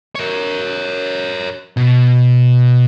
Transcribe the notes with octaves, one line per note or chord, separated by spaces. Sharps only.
A#4 C#5
B2